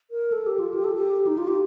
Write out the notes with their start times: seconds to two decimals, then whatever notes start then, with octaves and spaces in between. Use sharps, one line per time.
0.11 A#4
0.32 A4
0.47 G4
0.59 F4
0.74 G4
0.84 A4
0.95 G4
1.27 D#4
1.38 F4
1.48 G4